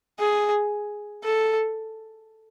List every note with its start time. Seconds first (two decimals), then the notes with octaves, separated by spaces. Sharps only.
0.19 G#4
1.24 A4